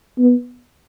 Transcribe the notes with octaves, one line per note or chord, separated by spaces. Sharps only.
B3